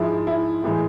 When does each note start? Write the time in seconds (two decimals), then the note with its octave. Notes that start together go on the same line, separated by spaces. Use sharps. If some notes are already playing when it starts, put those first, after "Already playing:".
Already playing: G#2 F3 G#3 E4
0.27 E4
0.63 A2 E3 G#3